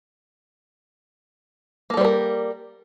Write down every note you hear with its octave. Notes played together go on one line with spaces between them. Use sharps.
G3 A#3 A4 A#4 C5